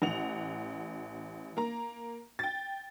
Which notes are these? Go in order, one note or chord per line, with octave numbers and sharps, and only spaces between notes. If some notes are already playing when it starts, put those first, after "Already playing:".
A1 F#5 F7
A#3 A#5
G5 A6